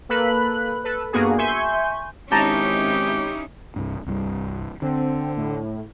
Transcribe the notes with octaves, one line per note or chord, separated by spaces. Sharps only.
A#3 A4 B4 B5 F#6
A4 B4
G2 A#3 B3 F#4 G#4
E5 G#5 C6 C#6 G6
G#1 C#4 D#4 E4 G4 A5 A#5
C2 G2
C2 G2 G3
D3 C4
A2